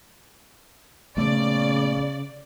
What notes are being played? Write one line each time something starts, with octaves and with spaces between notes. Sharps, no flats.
A#1 C#3 A3 B3 D5